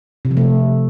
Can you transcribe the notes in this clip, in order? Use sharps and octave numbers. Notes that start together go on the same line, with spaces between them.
C3
F3
A3